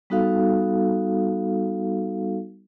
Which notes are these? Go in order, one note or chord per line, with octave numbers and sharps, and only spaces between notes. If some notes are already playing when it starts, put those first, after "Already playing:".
G3 B3 D#4 F#4 A4 F5